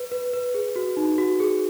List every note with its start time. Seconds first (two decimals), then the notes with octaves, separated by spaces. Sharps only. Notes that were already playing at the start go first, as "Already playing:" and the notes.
Already playing: B4
0.11 B4
0.33 B4
0.54 G#4
0.76 F#4
0.97 D#4
1.18 F#4
1.40 G#4